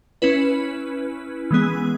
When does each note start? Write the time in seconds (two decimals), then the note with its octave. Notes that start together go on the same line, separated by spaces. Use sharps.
0.22 C#4 E4 B4
1.51 E3 G#3 B3 G#4